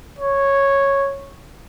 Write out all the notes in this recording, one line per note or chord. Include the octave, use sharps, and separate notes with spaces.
C#5